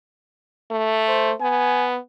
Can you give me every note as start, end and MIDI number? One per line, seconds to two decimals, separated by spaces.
0.71 1.32 57
1.08 1.34 72
1.41 1.98 59
1.41 1.87 80